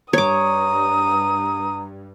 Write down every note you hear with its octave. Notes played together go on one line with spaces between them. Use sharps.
G2 C#5 A#5 D6 D#6